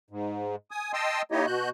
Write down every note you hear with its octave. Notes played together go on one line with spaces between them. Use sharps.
G#2
G#5 D#6
D#5 G5 A5 C6 D#6 E6
A#3 D#4 E4 G4 C#5 D#5
B2 F#4 F#6 G6